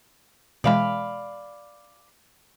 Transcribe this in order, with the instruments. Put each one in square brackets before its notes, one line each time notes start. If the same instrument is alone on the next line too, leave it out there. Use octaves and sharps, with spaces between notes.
[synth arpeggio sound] B2 E3 G#3 [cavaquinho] D5 F5 B5